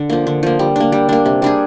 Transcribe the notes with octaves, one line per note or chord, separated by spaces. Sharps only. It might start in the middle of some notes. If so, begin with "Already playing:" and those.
Already playing: D3
F3 A#3
D3
F3 A#3
G3
A#3 D4
G3
A#3 D4
C3
G3 D4 G#4